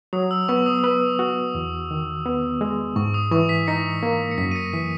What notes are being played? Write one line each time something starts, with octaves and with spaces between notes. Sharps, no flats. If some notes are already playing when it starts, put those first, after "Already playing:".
F#3 D#6
E6
B3 C#6
E6
D#6
D#6
B4 E6
F#4 D#6
E2
D#3
B3
G#3
G#2 C#6
D#6
E3 C#6
B6
D#4 A#6 C#7
A#3
C#7
F#2 B6
D#7
A#6 C#7
E3 B6